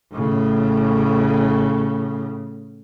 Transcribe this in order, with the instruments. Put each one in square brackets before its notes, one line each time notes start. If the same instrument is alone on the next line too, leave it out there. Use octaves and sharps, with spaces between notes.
[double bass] A2 C#3